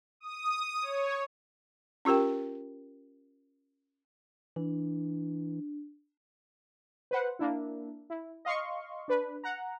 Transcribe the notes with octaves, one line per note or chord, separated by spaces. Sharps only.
D#6
C#5
C#4 F4 G4 A#4 G5
E3 D4
B4 C5 F#5
A#3 D4 E4
E4
D#5 F5 C6 C#6
D4 B4
F#5 A#5